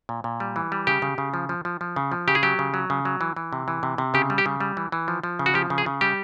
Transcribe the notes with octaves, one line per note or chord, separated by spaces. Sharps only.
A#2
A#2
G3
E3
G3
C#3 G4
C#3
C#3
F3
F3
F3
F3
C#3
F3
C#3 G4
G#4
F#3 G4
C#3
F#3
C#3
F#3
E3
E3
C3
E3
C3
C3
C#3 G4
G3
G4
C#3
G3
E3
E3
F3
F3
C#3
F#4
F3 G4
C#3
G#4
C#3
G3 G4